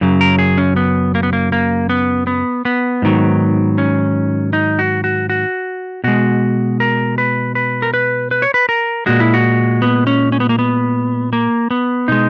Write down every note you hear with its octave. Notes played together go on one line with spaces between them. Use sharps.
F#2 C#3 F#3
A#4
G#4
C#4
B3
A#3
B3
A#3
A#3
B3
B3
B3
G#2 D#3 F#3
C#4
D#4
F#4
F#4
F#4
B2 G#3 F#4
A#4
B4
B4
A#4
B4
B4
C#5
B4
A#4
A#2 G#3 F#4
E4
F#4
B3
C#4
C#4
B3
A#3
B3
A#3
B3
B2 G#3 D#4